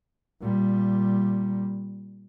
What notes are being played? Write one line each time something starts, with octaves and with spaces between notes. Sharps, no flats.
A#2 G3